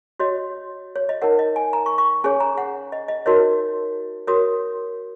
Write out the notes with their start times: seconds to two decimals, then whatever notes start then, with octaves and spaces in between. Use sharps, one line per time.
0.19 F#4 C#5 D#5
0.96 C#5
1.09 D#5
1.22 D#4 A#4 C#5 F#5
1.39 D#5
1.56 G#5
1.73 A#5
1.86 C#6
1.98 C#6
2.24 C#4 G#4 C#5 G#5
2.40 A#5
2.58 F#5
2.92 D#5
3.08 D#5
3.26 D#4 F#4 A#4 C#5 D#5
4.27 F#4 A#4 C#5 D#6